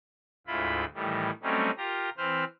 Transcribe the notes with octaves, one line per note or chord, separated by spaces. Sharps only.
D2 G#2 E4 F4 B5
A2 D#3 E3 G3
F#3 G3 A3 C4 C#4 D#4
F4 G4 A#4 A#5
E3 C4 B4 C5 F6